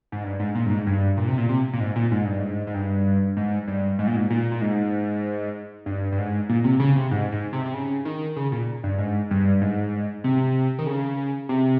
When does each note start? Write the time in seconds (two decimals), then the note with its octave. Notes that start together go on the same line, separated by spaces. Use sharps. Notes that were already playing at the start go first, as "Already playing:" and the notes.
0.12 G#2
0.24 G2
0.39 G#2
0.55 A#2
0.66 G2
0.71 G#2
0.86 G2
1.17 A#2
1.28 C3
1.38 A#2
1.49 C3
1.73 A#2
1.80 G#2
1.96 A#2
2.11 G#2
2.25 G2
2.39 G#2
2.67 G#2
2.74 G2
3.37 G#2
3.68 G2
3.99 G#2
4.07 A#2
4.16 G#2
4.30 A#2
4.51 A#2
4.61 G#2
5.86 G2
6.12 G2
6.18 G#2
6.49 A#2
6.64 C3
6.80 C#3
6.96 C3
7.11 G#2
7.32 G#2
7.53 C3
7.66 C3
7.74 C#3
8.05 D#3
8.36 C#3
8.52 A#2
8.84 G2
8.98 G#2
9.31 G2
9.61 G#2
10.24 C3
10.79 D#3
10.87 C#3
11.49 C3